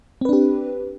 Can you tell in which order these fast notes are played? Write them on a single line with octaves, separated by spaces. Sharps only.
C4 B4 D4 G4